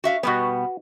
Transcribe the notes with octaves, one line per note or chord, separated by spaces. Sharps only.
F#4 E5 F5
B2 G3 B3 F#4 B4